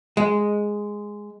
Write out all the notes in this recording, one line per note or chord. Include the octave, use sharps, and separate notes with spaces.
G#3